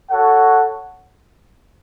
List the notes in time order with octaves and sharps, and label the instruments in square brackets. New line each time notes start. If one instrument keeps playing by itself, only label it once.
[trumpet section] F#4 A4 C#5 F#5